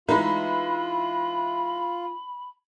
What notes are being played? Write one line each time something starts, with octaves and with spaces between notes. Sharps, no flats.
E3 G#3 D#4 F4 B4 B5